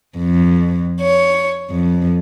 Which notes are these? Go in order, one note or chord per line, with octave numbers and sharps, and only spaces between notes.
F2
C#5
F2